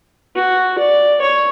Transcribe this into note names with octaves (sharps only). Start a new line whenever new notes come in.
F#4
D5
C#5